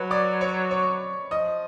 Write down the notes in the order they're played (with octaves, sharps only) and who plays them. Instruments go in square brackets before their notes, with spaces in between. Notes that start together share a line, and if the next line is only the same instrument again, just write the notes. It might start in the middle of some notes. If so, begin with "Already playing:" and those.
Already playing: [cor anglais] F#3 [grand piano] B4 B5
[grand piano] D5 D6
C#5 C#6
C#5 C#6
[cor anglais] F3 [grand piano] D#5 D#6